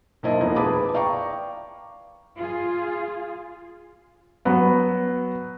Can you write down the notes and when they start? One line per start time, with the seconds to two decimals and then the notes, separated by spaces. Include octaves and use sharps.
0.23 B1 A#3 E4 C5 D#5 A5
0.40 F1 C2 F3 A#3 B3
0.56 G#4 B4 A5 B5 D6 D#6
0.94 D5 F5 G5 A#5 C#6 D6
2.38 F4 G#4
4.45 F#3 B3